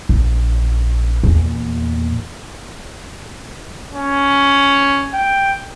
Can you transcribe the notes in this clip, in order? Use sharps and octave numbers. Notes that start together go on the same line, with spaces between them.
A#1
E2 A#2
C#4
G5